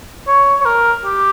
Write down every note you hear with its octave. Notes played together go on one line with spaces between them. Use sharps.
C#5
C#5
A#4
G4